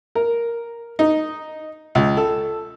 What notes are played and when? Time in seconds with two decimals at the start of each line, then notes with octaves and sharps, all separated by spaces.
0.15 A#4
0.99 D#4
1.95 C#2
2.17 A4